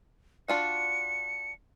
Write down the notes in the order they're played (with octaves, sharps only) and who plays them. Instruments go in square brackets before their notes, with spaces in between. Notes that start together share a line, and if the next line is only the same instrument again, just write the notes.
[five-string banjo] D4 F4 F#4 [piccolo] C#7